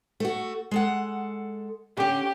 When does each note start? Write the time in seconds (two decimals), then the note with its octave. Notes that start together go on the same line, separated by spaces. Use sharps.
0.20 A3 F#4
0.71 G#3 A4 F#5
1.97 D3 C#4 G4